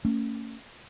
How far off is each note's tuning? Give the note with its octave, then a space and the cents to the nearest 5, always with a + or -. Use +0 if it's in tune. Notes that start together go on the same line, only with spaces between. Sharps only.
A3 +45 C#4 +0